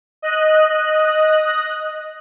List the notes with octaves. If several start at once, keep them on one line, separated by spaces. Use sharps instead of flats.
D#5 F#6